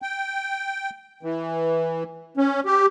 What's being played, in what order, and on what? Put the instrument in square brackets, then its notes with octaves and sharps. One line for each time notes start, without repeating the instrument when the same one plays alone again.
[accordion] G5
E3
C#4
G4